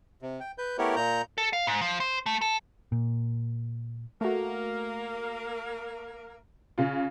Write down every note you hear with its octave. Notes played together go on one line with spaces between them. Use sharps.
C3
G5
B4 G6
A3 B3 E4 G4 A#4 C#5
A#2 A#5 G6
A4
F5
G#2
F3
C5
A3
A4
A#2
A3 A#3 F#4 A#4
C#3 F4